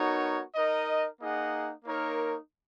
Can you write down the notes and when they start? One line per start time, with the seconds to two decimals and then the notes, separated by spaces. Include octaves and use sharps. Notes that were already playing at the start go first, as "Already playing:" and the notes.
Already playing: B3 D#4 F#4 A#4 C#5
0.55 D#4 A#4 D#5
1.20 A#3 D#4 G#4 D#5 F#5
1.84 A#3 D#4 A#4 C#5